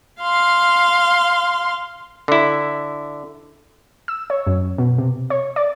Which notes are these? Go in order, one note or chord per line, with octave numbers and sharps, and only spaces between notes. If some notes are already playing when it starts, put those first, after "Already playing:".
F5 C6
D3 E4
E6
C#5
F#2
B2
C3
C#5
D5